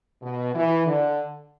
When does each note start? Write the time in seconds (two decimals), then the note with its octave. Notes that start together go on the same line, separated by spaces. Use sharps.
0.22 B2
0.54 E3
0.86 D3